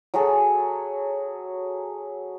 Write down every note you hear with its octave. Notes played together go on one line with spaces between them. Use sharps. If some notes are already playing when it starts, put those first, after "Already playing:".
F#3 F#4 G#4 A4